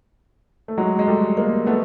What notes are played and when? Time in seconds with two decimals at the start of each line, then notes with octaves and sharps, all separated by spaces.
0.68 A3
0.78 F#3 G#3
0.99 G#3
1.07 G3 A3
1.37 G#3 A#3
1.66 A3 B3